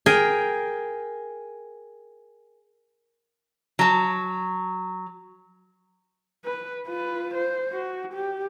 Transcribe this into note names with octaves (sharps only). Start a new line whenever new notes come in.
G#4 A#4 G5
F#3 A5
B4
F4 B4
C5
F#4
G4